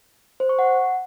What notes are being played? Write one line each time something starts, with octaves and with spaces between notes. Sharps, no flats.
C5
C#6
F#5